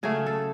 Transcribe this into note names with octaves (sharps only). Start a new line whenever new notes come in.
C#3 F#3 A3 G#4
A4